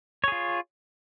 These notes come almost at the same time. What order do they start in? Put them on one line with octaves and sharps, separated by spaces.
C#5 G#4 F4